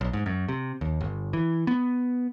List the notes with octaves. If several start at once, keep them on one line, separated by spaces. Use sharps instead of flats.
B1
G#2
F#2
C3
D#2
G1
E3
B3